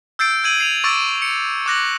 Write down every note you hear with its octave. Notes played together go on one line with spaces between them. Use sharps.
E6 G6 A6 C7 D7
E6 G6 G#6 D7 D#7 F#7
C7 D#7 F7
C#6 D6 E6 A6 D7
C#7
D6 F#6 A#6 F#7